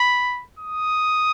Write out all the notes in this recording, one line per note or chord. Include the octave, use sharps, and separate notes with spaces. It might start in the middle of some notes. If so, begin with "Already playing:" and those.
Already playing: B5
D#6